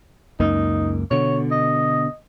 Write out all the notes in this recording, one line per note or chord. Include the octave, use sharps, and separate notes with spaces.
C#2 F#2 A#3 D#4
B2 D3 C#5
D#5